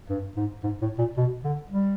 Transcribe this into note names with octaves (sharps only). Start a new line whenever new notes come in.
G2
G#2
G#2
A2
A#2
B2
D3
G3